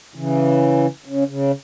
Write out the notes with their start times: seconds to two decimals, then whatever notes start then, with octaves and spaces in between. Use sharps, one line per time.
0.15 C#3 E3
1.05 C#3
1.28 C#3